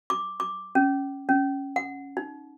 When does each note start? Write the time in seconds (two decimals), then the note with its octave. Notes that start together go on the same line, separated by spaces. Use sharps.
0.10 D6
0.40 D6
0.75 C#4
1.29 C#4
1.76 F#5
2.17 D#4